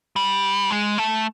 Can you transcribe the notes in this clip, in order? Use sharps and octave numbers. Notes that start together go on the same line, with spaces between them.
G3
G#3
A3